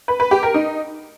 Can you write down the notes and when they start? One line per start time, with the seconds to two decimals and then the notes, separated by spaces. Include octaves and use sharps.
0.08 B4
0.20 B4
0.31 G4
0.43 A#4
0.54 D#4